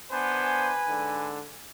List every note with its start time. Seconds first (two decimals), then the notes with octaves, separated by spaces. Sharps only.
0.12 B3 D4 B4 C5 G#5
0.88 G#2 D3